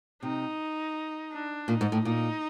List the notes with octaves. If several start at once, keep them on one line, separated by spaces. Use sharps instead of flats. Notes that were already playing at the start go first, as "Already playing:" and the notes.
C3 D#4
D4
A#2 D#4
G#2
A2
A#2 D#4